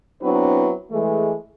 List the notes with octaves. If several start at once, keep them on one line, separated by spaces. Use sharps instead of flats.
F#3 B3 C4 D4 E4 B4
E3 G#3 A3